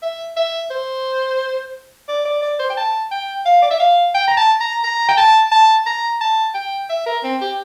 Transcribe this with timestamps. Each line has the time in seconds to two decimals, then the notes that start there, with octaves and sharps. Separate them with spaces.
0.02 E5
0.37 E5
0.71 C5
2.08 D5
2.25 D5
2.42 D5
2.60 C5
2.70 G5
2.77 A5
3.11 G5
3.46 F5
3.62 D5
3.71 E5
3.80 F5
4.15 G5
4.28 A#5
4.37 A5
4.60 A#5
4.84 A#5
5.09 G5
5.17 A5
5.52 A5
5.86 A#5
6.21 A5
6.55 G5
6.90 E5
7.06 A#4
7.24 C4
7.41 G4